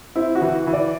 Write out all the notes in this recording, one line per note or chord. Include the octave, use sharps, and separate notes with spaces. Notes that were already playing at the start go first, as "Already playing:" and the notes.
C4 E4
F#4
E3
E3
D5